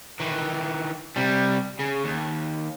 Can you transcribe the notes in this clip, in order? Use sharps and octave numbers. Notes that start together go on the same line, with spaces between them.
D#3 E3
C3 G3
C#3
D#2